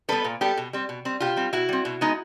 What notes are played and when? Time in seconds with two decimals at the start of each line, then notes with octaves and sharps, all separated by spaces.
0.08 G3 B3 A4 B4
0.24 A#2
0.41 G3 B3 G4 A4
0.57 B2
0.73 G3 C4
0.89 B2
1.05 G3 C4
1.20 B2 F4 G4
1.36 G3 C4
1.53 B2 E4 F#4
1.69 G3 C4
1.85 B2
2.01 G#3 B3 D#4